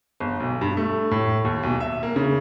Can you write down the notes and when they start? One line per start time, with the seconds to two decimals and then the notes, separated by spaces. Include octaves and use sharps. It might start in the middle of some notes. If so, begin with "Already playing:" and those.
0.20 G1
0.40 B1
0.61 G2
0.77 A3
1.11 A2
1.45 D#2
1.63 B1
1.80 E5
2.03 A#3
2.16 C#3